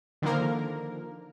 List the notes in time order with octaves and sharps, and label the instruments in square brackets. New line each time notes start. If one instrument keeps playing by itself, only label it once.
[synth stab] D3 D#3 F3 A#3 A#4